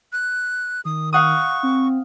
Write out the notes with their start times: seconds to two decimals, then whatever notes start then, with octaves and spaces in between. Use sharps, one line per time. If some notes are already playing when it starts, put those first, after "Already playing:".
0.13 F#6
0.85 D#3 D#6
1.13 F5 F#5 C#6 D#6
1.63 C4